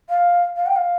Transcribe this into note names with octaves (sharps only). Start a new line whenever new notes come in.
F5
F5
G5
F5